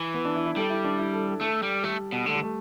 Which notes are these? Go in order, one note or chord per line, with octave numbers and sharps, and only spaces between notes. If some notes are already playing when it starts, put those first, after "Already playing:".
Already playing: E3
B3
D4
E4
E4
G3 A4
E4
D4
E4
A4
A4
A3 A4
G3
G3 A3
B2
D3 A3
G3
A3